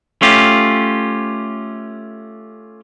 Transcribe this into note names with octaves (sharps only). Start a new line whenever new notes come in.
A3 C#4 F4 G4